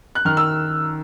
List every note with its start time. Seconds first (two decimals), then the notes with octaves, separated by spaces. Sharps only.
0.15 F#6
0.25 D#3 F6
0.37 E6